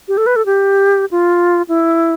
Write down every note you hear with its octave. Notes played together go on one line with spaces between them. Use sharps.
G4
A4
B4
A4
G4
F4
E4